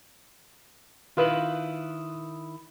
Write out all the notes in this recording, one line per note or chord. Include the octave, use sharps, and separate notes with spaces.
D#3 E4 F4 B4